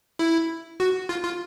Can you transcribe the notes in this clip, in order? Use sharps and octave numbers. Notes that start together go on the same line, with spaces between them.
E4
F#4
F4
F4